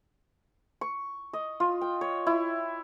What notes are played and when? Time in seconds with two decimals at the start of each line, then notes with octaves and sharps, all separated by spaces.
0.81 C#6
1.33 D#5
1.60 F4
1.81 G5
2.01 C#5
2.26 E4